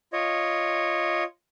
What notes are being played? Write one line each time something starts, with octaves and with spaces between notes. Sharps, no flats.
F4 C#5 D#5